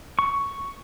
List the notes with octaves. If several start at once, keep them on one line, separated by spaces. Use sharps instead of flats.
C#6